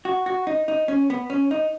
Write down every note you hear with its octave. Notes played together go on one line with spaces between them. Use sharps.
F#4
F#4
D#4
D#4
C#4
B3
C#4
D#4